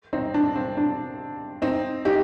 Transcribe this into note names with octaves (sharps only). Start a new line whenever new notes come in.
C4 D#4
D4
C4
D4
C4 D#4
D#4 G4